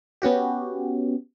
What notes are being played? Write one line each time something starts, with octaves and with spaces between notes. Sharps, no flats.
B3 C#4 F#4 G4